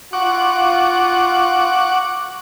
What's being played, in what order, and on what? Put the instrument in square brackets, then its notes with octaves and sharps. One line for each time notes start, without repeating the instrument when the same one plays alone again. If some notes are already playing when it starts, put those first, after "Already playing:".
[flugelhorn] F4 [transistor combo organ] F#5 C#6 D6